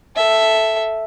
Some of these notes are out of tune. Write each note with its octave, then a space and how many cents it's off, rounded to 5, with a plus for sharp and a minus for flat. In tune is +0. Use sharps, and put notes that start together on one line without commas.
A4 +0 E5 +0